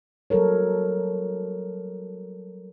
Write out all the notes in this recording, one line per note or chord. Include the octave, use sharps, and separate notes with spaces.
F#3 G3 A4 A#4 C#5